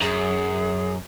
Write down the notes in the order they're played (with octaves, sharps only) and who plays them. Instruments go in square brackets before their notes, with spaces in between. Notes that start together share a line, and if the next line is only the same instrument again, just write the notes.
[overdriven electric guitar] F#2 [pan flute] G#4